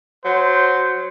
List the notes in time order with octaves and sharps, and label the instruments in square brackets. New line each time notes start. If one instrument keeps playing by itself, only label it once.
[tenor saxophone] F#3 [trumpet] C5